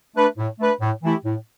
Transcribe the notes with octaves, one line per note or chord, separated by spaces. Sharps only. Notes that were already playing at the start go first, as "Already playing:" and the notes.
A3 D4 B4
A2
A3 D4 B4
A2
E3 A3 E4 G4
A2